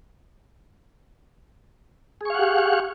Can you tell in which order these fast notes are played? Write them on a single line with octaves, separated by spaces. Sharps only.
G#4 C#6 F5 F#5 G4